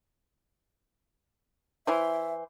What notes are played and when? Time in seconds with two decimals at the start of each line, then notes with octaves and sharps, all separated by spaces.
1.87 E3 E4 C5 E5